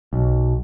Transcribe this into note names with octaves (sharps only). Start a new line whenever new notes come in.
B1